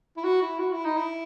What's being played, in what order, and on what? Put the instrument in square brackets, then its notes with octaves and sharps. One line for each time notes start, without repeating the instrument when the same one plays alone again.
[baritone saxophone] E4
F#4
E4
F#4
E4
D#4
E4